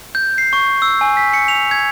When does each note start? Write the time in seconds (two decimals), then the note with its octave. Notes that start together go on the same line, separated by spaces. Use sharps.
0.15 G6
0.38 C7
0.53 C#6
0.82 E6
1.01 G#5
1.17 B6
1.33 C#7
1.48 F7
1.71 G#6